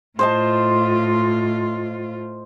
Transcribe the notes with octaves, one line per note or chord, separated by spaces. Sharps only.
A2 F4 C5 D#5 A5